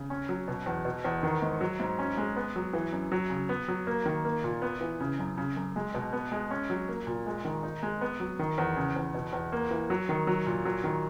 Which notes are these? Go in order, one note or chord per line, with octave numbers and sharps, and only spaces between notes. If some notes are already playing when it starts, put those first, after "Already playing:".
Already playing: C#3
C#4
F#3
B2
E2
B2
E2
D#3
G#2
F#3
G#2
C#4
G#3
B3
F#3
E3
F#2
F#3
C#3
B3
F#3
A#3
D#3
A#3
A#2
B3
E3
C#3
F#2
C#3
F#2
G#3
B2
B3
G#3
C#4
F#3
A#3
A#2
G#3
D#3
D#4
G#3
B3
F#3
D#3
E2
C#3
E2
B2
E2
A#3
E3
F#3
D#3
F#3
A#2
F#3
D#3